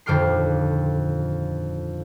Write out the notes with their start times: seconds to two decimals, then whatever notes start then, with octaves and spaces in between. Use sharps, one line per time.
0.06 D#1 F2 D3 G5 F6 C7